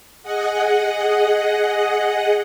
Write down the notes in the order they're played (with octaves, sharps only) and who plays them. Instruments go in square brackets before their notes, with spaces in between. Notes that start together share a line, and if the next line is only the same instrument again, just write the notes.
[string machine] G#4 D#5 F#5